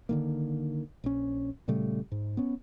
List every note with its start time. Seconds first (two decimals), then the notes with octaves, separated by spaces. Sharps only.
0.09 D3 D#3 A#3
1.04 A#1 C#4
1.68 A#2 C#3 G3 A3
2.12 G#2
2.37 B3 C#4